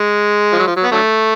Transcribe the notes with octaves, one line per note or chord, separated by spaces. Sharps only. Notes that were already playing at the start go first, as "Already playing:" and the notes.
Already playing: G#3
F3
F#3
F3
F#3
B3
D3 F#3 A3